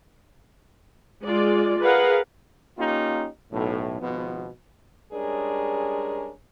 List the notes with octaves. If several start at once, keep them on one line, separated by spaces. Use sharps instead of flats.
G#3 F4 D5
G#4 A#4 B4 F5 F#5
A#3 C#4 D#4 F4 G4
B1 A2
G#1 B2 F3 B3
G3 G#3 C#4 D4 G#4 A#4